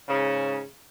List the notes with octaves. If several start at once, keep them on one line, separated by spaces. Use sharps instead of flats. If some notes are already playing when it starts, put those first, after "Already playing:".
G#2 C#3